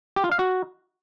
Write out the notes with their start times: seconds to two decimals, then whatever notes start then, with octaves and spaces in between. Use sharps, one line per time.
0.16 G4
0.24 F4
0.32 F5
0.39 F#4